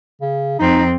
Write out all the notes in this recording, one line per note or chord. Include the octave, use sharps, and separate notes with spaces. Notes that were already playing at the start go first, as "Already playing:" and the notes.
C#3
F2 C4 D#4